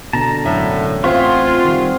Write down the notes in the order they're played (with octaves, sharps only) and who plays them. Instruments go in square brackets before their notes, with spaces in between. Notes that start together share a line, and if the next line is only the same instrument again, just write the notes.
[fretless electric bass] B2 D3 [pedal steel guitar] A5 A#5
[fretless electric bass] E1 F#2 [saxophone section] A2 [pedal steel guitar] D3 E5
[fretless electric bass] A1 [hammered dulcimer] C4 F#5 [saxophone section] F4 [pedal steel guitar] G#4 E5 C#6
[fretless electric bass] D#3 G3